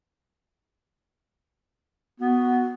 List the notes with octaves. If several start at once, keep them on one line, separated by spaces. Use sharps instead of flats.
B3 F#4